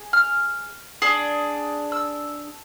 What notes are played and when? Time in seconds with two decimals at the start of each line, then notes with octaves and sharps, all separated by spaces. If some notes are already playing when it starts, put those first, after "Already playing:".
Already playing: G#4
0.13 F6
1.02 D4 G#4
1.92 E6